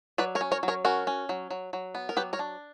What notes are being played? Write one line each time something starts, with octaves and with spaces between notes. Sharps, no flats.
F#3 B4 D5
A#4 C#5
C#4
A#4 C#5
F#3
A#4 C#5
C#4 F#4 A#4
C#4
F#3
F#3
F#3
B3
A#4
F#3 G4 B4
A#4 C#5
D4